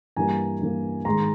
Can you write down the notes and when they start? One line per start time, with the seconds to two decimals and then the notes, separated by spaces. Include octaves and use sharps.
0.17 G2 E3 G3 A#3 G#5 A#5
0.61 G2 E3 G3 A#3
1.05 G#2 D#3 G#3 A#5 C6